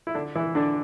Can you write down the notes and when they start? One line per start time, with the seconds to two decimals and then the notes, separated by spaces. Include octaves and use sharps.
0.07 E4
0.15 D3 D4
0.36 E3 E4
0.55 D3 D4